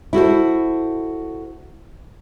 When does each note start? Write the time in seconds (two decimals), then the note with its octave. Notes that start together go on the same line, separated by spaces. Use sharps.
0.13 E4 F#4 A4 C5